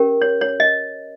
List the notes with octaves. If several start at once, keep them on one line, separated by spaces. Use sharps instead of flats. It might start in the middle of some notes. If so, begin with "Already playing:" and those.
Already playing: C#4 G4 A#4
C#5
C#5
D#5